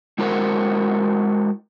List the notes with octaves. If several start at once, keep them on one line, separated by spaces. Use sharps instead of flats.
G#3 E4 F#4 A#4 C5